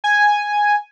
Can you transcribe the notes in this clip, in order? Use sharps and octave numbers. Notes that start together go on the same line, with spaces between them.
G#5